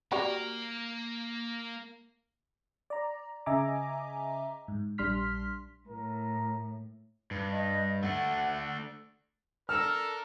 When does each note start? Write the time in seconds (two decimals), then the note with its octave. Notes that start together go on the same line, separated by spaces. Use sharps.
0.12 A#3 F#4 G4 D5 A#5
2.90 D5 A#5
3.46 C#3 D#5 E5 G#5 A#5 D6
4.68 G#2
4.98 A#1 G3 D4 C6 F6 B6
5.88 A2 A#4
7.31 G2
7.52 D#5
8.03 A3 D4 F#5
9.69 D4 A4 A#4 F6